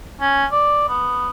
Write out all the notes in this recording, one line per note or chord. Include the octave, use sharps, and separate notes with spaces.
C#4
D5
B3